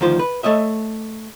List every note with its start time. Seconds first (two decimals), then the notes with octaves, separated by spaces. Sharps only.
0.01 D2 D#3 F3 F4 C5
0.19 B4
0.43 A3 C#5 D#5 E5